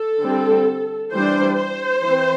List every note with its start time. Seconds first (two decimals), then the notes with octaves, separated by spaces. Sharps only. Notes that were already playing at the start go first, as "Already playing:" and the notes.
Already playing: A4
0.21 D3 G3 C4
1.12 E3 G3 D4 C5
1.57 C5
2.02 E3 C4